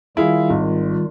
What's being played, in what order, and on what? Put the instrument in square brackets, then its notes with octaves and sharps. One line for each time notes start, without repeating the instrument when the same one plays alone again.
[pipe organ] D#3 G3 F4 [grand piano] E4 G#4 F5
[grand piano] G#1